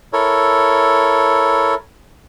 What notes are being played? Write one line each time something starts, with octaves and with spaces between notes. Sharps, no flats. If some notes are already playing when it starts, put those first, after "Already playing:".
E4 A4 A#4 C#5